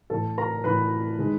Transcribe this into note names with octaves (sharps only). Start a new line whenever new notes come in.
A2 E3 A3 A4 A5
A#4 A#5
A2 E3 A3 B4 B5
D#3 G#3